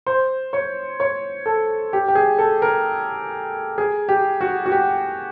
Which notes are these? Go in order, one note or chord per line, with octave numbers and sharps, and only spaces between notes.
C5
C#5
C#5
A4
G4
G4
G#4
A4
A#4
G#4
G4
F#4
F#4
G4